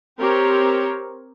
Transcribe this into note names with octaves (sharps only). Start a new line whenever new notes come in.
C4 G4 A#4 C#5